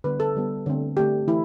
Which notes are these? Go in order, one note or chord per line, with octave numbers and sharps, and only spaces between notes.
D3 G3 B3 B4
A4
D3 G3 B3
D3 A3 C4
D3 A3 C4 G4
E3 A3 E4